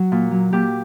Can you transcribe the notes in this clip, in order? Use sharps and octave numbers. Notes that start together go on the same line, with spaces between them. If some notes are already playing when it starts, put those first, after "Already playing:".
Already playing: F#3 F#4
A#2
F#3
A#2 G4